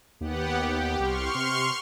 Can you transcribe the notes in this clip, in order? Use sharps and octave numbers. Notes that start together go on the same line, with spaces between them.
D#2 B3 G4 F#5
G4
C2 C6 C#6 F6
C3